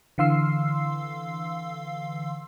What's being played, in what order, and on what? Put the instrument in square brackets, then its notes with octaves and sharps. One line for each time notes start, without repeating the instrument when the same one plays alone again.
[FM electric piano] D3 E3 F5 C6 E6 C7